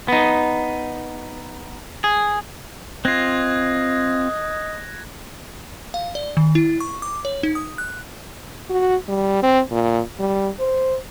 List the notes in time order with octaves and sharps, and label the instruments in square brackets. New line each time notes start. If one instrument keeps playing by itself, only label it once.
[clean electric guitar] B3 D#4
G#4
[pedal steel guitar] C4 F4 [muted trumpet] D#5 [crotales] F#6 G#6 A#6
[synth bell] F5
D5
D#3
E4
C#6
D6
C#5
D#4
D#6
F#6
[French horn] F#4
G3
C4
A#2
G3
C5